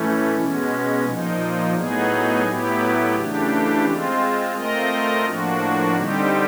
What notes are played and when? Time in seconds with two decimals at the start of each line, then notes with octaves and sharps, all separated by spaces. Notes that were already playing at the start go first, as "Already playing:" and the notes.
Already playing: A2 E3 A3 C#4
0.35 B2 G#3 C#4
1.05 A#2 F3 A#3 D#4
1.75 A2 F#3 B3 D#4 G#4
2.45 A2 F#3 B3 E4 G4
3.15 C#3 E3 A3 D4 G4
3.85 G#3 C4 F4
4.55 A3 C4 F4 A#4 D#5
5.26 A2 F3 A#3 D4 F#4
5.95 D3 G3 C4 D#4 G4